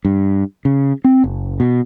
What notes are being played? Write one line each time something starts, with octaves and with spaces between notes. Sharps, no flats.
G2
C#3
C4
F#1
B2